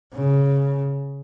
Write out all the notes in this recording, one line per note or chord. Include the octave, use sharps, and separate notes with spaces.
C#3